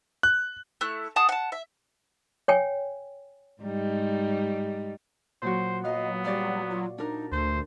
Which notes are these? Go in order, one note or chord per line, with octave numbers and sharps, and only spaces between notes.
F#6
A3 E4 F#6
G#4 F#5 A5 D#6
F#5 A5
E5
C#5 G5 G#5
G#2 G3 D#4
A#2 F#3 F#4 C5
F#3 B3 D#5 F5
G3 F#4 D5 F5
F4
D4 D#4 A#4
D2 A3 C5